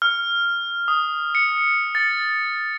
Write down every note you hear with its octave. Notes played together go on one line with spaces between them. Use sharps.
F6
D#6
C#7
A6